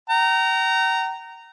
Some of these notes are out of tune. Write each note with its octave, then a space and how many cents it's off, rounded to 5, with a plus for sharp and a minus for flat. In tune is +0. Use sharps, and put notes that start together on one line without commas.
G5 -45 A#5 -10